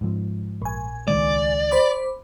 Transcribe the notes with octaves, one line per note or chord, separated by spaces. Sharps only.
G#2 F3
A#1 G#5
C#2 D#3 G#3 D5
C5 B5 D6